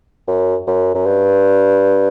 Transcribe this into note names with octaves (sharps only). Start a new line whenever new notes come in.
F#2
F#2
F#2
G2